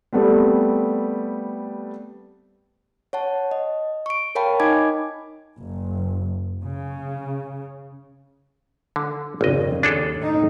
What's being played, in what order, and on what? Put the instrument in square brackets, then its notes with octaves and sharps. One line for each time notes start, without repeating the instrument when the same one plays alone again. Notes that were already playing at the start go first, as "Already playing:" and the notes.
[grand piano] G3 A3 B3 C4
[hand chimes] C#5 F#5 A5
D#5
C#6 D7
A#4 C#5 F5 G5 A5 B5
D#4 D#5 G#5 B5 D6 G#6
[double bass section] F#1
C#3
[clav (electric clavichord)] D3
[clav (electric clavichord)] G#1 D#5 [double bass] F2 C#3
[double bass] D#2 [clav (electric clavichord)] D4 G#4 A4
[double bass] A2 D#4